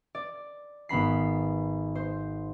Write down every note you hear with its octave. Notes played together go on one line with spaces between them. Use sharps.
D5
G#1 B3 B5 C7
C5